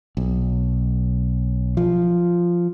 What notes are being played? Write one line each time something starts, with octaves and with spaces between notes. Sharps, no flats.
B1
F3